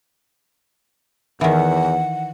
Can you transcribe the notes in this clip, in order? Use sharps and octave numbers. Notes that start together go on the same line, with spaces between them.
E2 D#3 E3 F#5